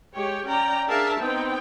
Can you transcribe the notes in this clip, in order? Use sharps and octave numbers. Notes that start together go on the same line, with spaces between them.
G#3 G4 C#5 G5
C#4 D5 G5 A#5
D4 G#4 A#4 E5 F5 A5
B3 C4 D#4 G5